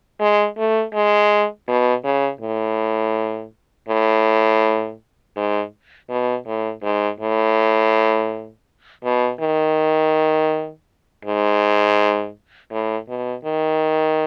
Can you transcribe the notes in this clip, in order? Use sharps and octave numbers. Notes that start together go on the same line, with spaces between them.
G#3
A3
G#3
B2
C#3
A2
A2
G#2
B2
A2
G#2
A2
B2
D#3
G#2
A2
B2
D#3